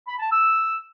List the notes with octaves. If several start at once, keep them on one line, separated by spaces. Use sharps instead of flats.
B5
A5
E6